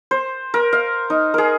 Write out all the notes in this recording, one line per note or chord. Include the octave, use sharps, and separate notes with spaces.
C5
A#4
F5
D#4
G#4 A#4